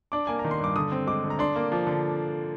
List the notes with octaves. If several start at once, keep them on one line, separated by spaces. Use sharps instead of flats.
D4 D6
A#3 G#5
A#5
D#3
C6
G2 D6
D3 D#6
C4
G#3 D6
D3
A#5
D4 C6
A#3
F3
D3